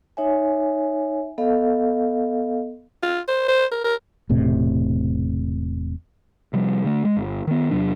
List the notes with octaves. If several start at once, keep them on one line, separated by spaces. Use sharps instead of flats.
D#4 C#5 E5 G#5
B3 A4 D#5 F5
F4
C5
C5
A#4
A#4
E1 A2 C3
C3 F3 G3
D3 A3
G#3
G1
D#3 B3
E2 C3 F#3 D4